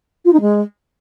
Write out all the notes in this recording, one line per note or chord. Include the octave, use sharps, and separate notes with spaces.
F4
D#4
G#3